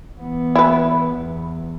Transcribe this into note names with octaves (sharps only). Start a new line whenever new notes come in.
E3 B3
E4 B4
E2